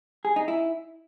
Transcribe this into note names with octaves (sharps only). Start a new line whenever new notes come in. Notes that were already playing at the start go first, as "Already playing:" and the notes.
G#4
D#4
E4